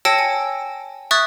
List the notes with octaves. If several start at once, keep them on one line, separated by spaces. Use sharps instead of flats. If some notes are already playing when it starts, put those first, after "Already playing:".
C#5 G5 A5 E6 A#6 C#7
G#5
E5 C#6 D#6 F#6 G#6 A6